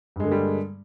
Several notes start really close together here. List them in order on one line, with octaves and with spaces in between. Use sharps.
G2 G#3 D3 A#3 G3